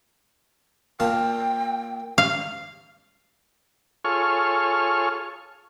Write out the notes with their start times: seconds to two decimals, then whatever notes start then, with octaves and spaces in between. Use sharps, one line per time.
1.00 A#2 F5 G5 A5
2.18 F5
4.05 F4 G#4 A4 C#5 C#6 F6